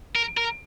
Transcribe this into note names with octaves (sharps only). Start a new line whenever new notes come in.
A#4
A#4